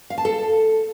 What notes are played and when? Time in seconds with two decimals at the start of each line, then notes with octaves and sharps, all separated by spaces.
0.10 F5
0.18 A5
0.25 A4